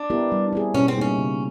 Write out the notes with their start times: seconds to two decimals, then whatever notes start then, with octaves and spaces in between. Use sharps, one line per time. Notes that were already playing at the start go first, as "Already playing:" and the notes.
Already playing: D4
0.10 B3 E4 G4 A#4
0.32 G3
0.53 C4 E4 G#4
0.74 B2 C#4
0.88 C4
0.96 G3 A#3 C#4 D#4 G#4
1.18 C#3